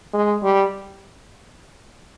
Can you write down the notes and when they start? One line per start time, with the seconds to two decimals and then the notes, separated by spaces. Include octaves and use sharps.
0.13 G#3
0.43 G3